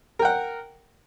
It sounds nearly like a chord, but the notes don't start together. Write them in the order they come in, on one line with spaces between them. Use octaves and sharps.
A#4 G5 F#5